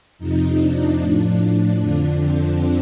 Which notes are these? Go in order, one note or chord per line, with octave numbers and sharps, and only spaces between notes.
F2 C3 F3 D#4
D4
A2 F3 D4
F2 D3 F3
C4